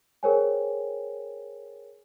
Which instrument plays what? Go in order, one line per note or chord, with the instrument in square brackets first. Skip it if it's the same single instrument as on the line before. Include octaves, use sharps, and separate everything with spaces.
[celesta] G#4 A#4 C5 C#5 G5 G#5